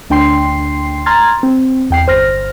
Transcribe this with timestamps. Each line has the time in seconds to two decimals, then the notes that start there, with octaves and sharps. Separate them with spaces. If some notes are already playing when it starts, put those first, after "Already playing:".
0.10 D2 D4 G5 C6 C7
1.06 A#5 C6 F6 G#6 A6
1.43 C4
1.90 E2 G5 C7
2.07 G1 C5 F6 A#6